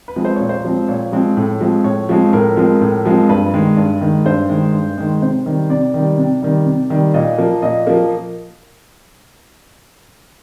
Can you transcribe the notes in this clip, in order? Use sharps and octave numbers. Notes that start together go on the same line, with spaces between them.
B4
F3 G#3 C4
C5
A#2 C#5
C5
F3 G#3 C4
A#2 C#5
F3 G#3 C4
A2
F3 G#3 C4
A2 C#5
F3 G#3 C4
A2 A#4
F3 G#3 C4 A#4
A2 A#4
F3 G#3 C4
G2 B4
D#3 G#3
G2
D#3 G#3
G2 C5
D#3 G#3
G2
D#3 G#3
C3 C5
D#3 G3
C3 D5
D#3 G3
C3
D#3 G3
C3
D#3 G3
A#2 D#5
F3 A#3
A#2 D#5
F3 A#3